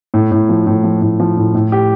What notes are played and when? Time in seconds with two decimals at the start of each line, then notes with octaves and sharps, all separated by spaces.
0.14 A2
0.32 A2
0.49 F3
0.67 A2
0.84 F3
1.02 A2
1.20 F3
1.37 A2
1.54 A2
1.72 G4